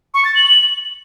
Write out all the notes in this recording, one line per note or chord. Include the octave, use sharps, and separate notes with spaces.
C#6
A6
F#7